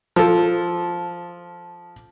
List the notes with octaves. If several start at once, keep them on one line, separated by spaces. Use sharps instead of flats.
F3 A4